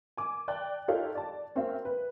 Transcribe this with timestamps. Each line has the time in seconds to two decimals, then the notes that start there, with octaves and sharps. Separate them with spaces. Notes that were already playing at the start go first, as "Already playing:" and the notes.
0.17 G#5 D6
0.48 D5 G5 A5 F#6
0.88 D#4 F4 G4 A4 C#5 F5
1.15 D5 A5
1.55 A#3 C4 C#4 F#4 E5 F5
1.85 B4